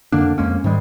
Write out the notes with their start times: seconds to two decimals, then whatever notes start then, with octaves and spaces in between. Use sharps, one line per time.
0.12 F2 D3 A#3 D4
0.38 F2 G#3 A#3 C#4
0.64 G#2 D#3 G3 G#3